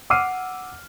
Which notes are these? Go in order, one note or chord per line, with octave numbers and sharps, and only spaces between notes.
F#5 D6 E6 F6 C7 D#7